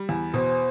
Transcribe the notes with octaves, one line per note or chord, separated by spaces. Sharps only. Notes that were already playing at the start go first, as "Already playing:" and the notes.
Already playing: G3
E2
B2 C5